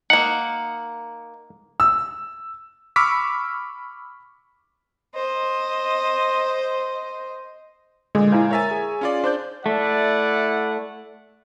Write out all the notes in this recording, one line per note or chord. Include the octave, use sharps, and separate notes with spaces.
A#3 D#4 F#5
E6
B5 C#6 D6 E6 F6 B6
C5 D#5
A#2 D3 G#3
E4 C5 F5 G#5 A#5
A#4 C#5 E5 G#5 A#5 A6
G#4
C#4 F4 D5
D4 C5 D5 G6
A3 E4 D5 F#5